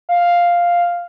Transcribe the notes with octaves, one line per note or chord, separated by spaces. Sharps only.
F5